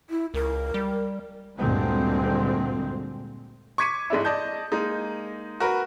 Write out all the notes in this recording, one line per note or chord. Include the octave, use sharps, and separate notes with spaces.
E4
C#2 A#4
G3
D2 G2 A#2 D3 G#3 C4
C#6 D6 G#6 B6 C#7 D#7
G#2 G#3 D4 E4
D5 D#5 A5 G6
G#3 A#3 D#4
F#4 A#4 B4